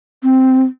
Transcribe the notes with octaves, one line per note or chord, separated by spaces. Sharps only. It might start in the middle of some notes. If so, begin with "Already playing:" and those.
C4